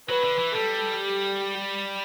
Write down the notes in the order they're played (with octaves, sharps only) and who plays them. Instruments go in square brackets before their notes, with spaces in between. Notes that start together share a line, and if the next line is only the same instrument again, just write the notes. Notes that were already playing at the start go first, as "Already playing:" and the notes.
[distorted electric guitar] F#3 [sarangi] B4
[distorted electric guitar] D3
E3
[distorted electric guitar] G3 [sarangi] A4
[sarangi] G4